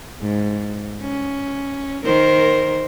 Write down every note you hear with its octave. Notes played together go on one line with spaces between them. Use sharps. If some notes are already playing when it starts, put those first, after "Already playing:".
G#2
C#4
D#3 A#4 C5